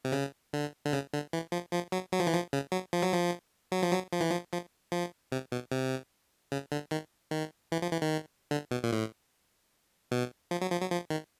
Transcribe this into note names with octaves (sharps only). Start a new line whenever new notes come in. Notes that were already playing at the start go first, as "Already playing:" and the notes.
C3
C#3
D3
D3
C#3
D3
E3
F3
F3
F#3
F#3
F3
E3
F3
C#3
F#3
F3
F#3
F3
F#3
F3
F#3
F3
E3
F3
F3
F3
C3
B2
C3
C#3
D3
D#3
D#3
E3
F3
E3
D#3
D3
B2
A#2
A2
B2
F3
F#3
F3
F#3
F3
D#3